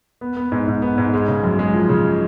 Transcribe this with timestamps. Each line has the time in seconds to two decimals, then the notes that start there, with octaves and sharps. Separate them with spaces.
0.21 B3
0.37 B3
0.52 G#2
0.68 G#2
0.82 B3
0.98 G#2
1.14 G#3
1.28 C#3
1.44 F#2
1.59 G#3
1.74 F3
1.89 C#3